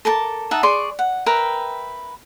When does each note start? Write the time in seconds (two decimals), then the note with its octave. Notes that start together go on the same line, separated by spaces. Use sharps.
0.05 A4 A#4 A5 D6
0.51 D#4 E5 F#5 A5
0.63 G#4 D5 C6 C#6
0.99 F#5
1.26 A#4 B4 E5 G5